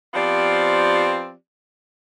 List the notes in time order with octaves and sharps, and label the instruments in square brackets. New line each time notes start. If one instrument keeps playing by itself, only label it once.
[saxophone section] F3 B3 C4 F4 G4 D5